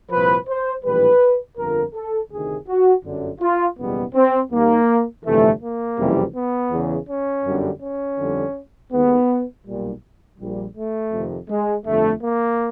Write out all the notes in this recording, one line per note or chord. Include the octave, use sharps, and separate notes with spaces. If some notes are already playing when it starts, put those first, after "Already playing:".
C2 A#2 F3 B4
C5
A#1 A2 E3 G3 B4
G1 F2 D3 F3 A#4
A4
D2 C3 D#3 G#4
F#4
G1 F#2 D3
F4
F#1 E2 B2 G3 B3
C4
D#2 D#3 G3 A#3
G1 F2 C3 E3 A3
A#3
F#1 F2 C3 E3 G3
B3
E2 C#3 E3
C#4
G1 F#2 D3 G3
C#4
F2 D3 G3
D#2 D#3 G#3 B3
B1 A#2 G3
A#1 A#2 G3
A3
F2 C3 D#3
G#3
G1 F2 D3 A3
A#3